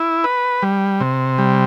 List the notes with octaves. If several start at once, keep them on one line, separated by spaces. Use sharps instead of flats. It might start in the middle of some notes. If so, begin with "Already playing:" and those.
Already playing: E4
B4
G3
C3
G3